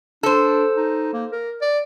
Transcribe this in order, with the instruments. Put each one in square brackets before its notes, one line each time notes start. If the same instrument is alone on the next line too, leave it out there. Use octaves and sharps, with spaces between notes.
[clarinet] D4 [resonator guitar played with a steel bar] A4 C5
[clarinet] D#4
A#3
A#4
D5